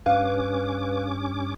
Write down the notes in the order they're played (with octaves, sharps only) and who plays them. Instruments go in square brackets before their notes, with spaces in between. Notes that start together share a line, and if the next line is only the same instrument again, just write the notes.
[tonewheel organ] G2 C#4 D6 [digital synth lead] B4 [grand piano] F5